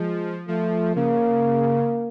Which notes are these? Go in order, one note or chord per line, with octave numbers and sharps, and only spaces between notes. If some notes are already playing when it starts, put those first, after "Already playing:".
Already playing: F3 G#3
F3 A3
C#3 A#3